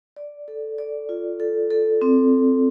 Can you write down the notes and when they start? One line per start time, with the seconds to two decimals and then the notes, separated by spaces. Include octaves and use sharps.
0.16 D5
0.48 A4
0.78 D5
1.09 F4
1.40 A4
1.71 A4
2.02 C4